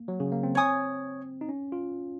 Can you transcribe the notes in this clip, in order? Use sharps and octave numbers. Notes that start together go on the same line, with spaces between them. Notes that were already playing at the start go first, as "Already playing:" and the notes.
Already playing: A#3
F#3
C#3
A#3
C4
C#5 G#5 D#6
D#4
C#4
F4